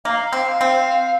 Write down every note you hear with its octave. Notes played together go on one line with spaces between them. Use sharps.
A#3 F5
C4
C4